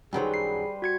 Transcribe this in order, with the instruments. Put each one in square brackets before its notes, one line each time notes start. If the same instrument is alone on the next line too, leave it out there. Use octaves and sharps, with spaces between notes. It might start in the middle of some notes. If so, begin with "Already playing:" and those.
[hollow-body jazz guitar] F#2 D#3 F#3 [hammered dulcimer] G3 B4 C5 [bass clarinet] G#4
[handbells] C7
F#4 G#6 C#7